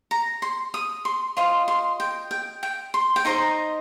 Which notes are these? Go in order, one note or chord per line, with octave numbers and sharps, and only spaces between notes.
A#5
C6
D#6
C6
F4 C5 D#5 C6
C6
G5
G5
G5
C6
G5
D#4 C5 D#5 A#5